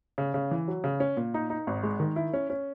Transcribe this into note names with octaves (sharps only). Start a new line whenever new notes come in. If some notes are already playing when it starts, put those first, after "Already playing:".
C#3
C#3
E3
F#3
C#3
C#4
A#2
D#4
D#4
G#1
G#3
D#3
E4
C#4
C#4